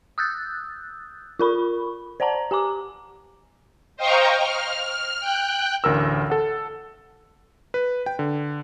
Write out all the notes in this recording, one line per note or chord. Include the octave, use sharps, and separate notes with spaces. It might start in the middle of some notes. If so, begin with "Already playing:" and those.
D#6 E6 F#6 G6 A6
F4 A#4 B5 C#6
C5 D5 F#5 A5 A#5
G4 G#5 A#5 D6
C5 D#5 F5 G5 A#5 C#6
F6
G5 F#6
A1 D2 A#4 E6
A4 F#5
B4
G5
D3